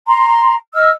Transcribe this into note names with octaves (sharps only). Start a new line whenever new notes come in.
A#5 C6
D#5 E6 F6